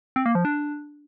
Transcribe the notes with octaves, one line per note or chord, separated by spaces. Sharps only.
C4
A#3
F3
D4